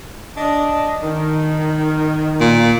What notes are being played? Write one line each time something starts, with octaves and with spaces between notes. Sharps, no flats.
D4 D#5
D#3
A#2